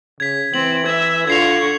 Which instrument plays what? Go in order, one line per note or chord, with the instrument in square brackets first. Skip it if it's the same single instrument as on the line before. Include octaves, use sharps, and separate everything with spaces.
[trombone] C#3 [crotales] G#6 B6
[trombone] E3 [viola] C4 [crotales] F#7
[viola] E5 [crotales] G#6
[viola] D3 C#6 [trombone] F4 [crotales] G#6 C7 F7